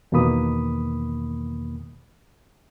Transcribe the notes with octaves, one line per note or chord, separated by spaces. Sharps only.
E2 B2 D#3 A#3 B5 D#6